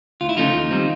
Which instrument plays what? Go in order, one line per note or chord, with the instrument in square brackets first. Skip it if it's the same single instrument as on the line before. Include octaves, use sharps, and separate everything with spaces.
[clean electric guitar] D2 F4
E4
C#3 F3 A3 C#4 D#4 F4
D#2
D#3 G3 C4